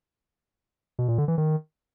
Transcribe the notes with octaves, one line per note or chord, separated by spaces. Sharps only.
B2
A#2
D3
E3
D#3